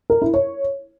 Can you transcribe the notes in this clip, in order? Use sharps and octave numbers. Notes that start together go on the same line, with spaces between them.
A#4
E4
C#5